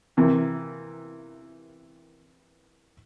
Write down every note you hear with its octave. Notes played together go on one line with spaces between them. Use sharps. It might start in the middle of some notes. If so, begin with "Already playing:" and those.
C3 E3 A#3